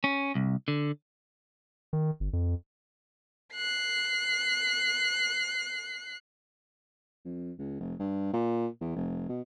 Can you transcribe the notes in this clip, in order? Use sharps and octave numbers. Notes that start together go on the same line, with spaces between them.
C#4
C2
D3
D#3
G1
F2
F#6 C7
F2
C#2
F1
G2
A#2
E2
F1
B2